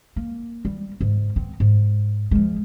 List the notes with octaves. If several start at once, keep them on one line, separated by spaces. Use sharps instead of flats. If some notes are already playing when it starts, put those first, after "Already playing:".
A#3
G3
G#2
B3 C4
G#2
F3 G#3